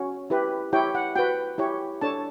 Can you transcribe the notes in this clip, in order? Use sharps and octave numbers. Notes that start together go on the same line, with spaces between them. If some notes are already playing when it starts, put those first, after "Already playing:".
Already playing: C#4 F#4 C#5
E4 G4 B4
E4 G4 C#5 G5
F#5
F#4 B4 G5
E4 G4 C#5
D4 A4 C#5 A5